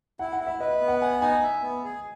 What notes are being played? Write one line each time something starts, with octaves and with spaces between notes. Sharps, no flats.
E4 F#5
F#5
E4
E5
B4 D#5
B3
F#5
F#5 G#5
D#4 G#5
E5
B3
G#4